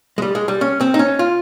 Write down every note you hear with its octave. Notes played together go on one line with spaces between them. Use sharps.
G#3
G3
G#3
G3
C#4
C4
D#4
C#4
F4